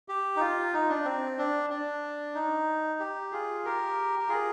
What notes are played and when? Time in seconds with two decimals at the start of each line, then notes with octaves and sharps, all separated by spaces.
0.09 G4
0.36 D#4
0.40 F4
0.74 D#4
0.89 D4
1.05 C4
1.38 D4
1.70 D4
2.35 D#4
3.00 G4
3.32 F4 G#4
3.65 G4 A#4
4.19 G4
4.29 F4 G#4